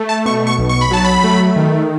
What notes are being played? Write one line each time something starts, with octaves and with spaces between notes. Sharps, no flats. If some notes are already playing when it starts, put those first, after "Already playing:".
Already playing: A3
A5
B2 C#6
C#6
B1
C#6
B5
F#3 A5
B5
A3
D#3